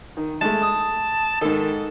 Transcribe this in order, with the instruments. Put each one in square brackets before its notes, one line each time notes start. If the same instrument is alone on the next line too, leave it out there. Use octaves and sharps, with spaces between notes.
[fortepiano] D#3
[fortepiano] G#3 A3 [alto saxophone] A5
[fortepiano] D#6
[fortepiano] G#2 A4 [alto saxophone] D#3